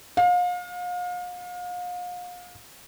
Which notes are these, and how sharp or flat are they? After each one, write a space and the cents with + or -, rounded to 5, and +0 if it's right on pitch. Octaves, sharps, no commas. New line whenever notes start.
F5 +35